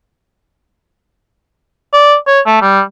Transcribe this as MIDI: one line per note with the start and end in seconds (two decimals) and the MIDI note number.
1.93 2.16 74
2.27 2.40 73
2.47 2.61 57
2.62 2.81 55